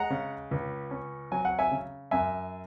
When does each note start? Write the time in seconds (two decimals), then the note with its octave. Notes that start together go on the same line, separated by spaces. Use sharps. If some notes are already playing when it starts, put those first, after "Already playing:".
Already playing: G#3 F#5 A#5
0.10 C#3
0.51 C#2
0.91 C#4
1.32 F#3 G#5
1.45 F#5
1.59 E5 G#5
1.71 C#3
2.11 F#2 E5 G#5